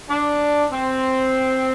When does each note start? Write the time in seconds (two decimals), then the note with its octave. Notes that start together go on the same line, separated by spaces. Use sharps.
0.10 D4
0.73 C4